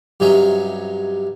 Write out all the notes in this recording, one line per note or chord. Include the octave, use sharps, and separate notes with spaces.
G2 C3 F#3 C#4 D#4 E5